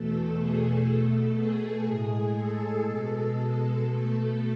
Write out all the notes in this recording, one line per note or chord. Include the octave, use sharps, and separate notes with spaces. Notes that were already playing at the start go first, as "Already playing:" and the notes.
Already playing: E2 B2 A3 A4
G#4
B2 A3 A4
G#4
A2 G#3
A4
B2 G#3
B2 A3 A4